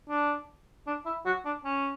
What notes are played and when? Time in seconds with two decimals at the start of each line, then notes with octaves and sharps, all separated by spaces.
0.09 D4
0.87 D4
1.05 E4
1.25 F#4
1.45 D4
1.64 C#4